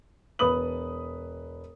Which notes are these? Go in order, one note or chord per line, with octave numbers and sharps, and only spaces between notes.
E1 B4 D#6 F#7